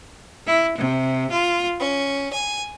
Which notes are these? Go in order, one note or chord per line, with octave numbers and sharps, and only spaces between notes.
E4
C3
F4
C#4
G#5